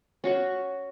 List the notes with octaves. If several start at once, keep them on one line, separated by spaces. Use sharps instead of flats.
C#4 F#4 C#6